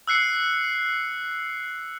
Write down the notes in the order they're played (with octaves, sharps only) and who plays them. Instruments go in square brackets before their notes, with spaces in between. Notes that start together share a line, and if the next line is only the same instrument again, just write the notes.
[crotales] E6 F#6 C7 C#7